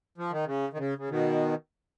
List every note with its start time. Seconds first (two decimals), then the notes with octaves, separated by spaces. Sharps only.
0.18 F3
0.31 D#3
0.46 C#3
0.73 D#3
0.78 C#3
0.98 C#3
1.10 B2 D#3